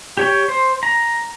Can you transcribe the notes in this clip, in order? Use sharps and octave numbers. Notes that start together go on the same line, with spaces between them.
G4 C#5 G5
C5
A#5